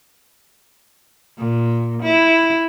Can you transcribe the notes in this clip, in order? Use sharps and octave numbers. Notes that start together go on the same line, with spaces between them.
A#2
E4